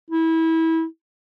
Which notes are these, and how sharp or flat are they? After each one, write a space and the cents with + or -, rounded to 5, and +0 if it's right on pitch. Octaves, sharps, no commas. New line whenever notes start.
E4 -25